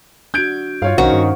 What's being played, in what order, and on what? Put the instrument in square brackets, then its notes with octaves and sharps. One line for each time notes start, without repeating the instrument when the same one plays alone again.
[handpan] D4 F#4 [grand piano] G6 G#6 D7
[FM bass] G2 [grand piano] F4 C#5 F5
[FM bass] B1 [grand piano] D#3 C#4 D#4 [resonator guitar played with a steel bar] F#4 [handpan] C5 F5 F#5
[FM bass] G2